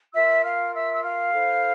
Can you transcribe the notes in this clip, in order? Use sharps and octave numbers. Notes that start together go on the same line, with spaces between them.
F4 A#4 E5 E6
F5 F6
E5 E6
E6
F5 F6
E4 A4 C5